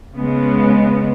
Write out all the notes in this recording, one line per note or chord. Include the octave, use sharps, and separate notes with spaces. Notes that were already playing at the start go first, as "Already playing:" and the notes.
C#3 G#3 B3